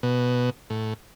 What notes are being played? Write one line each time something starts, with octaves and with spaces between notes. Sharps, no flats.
B2
A2